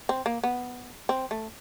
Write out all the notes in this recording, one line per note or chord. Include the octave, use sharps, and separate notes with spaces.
C4
A#3
B3
C4
A3